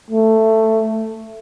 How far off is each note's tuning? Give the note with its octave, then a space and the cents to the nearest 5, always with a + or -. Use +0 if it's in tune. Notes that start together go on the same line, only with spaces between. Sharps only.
A3 +10